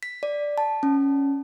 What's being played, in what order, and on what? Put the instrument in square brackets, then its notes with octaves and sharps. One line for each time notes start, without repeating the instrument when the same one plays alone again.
[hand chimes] B6
D5
A5
C#4